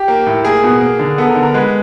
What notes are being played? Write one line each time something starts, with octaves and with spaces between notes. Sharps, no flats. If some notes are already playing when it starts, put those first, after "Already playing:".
Already playing: G4
A#3
A2
A#3 G#4
B2
A#3
D3
B3 A4
A#4
D3
A#4
G#3 B4